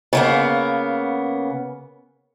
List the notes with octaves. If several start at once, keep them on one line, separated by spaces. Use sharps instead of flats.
C#3 A#3 B3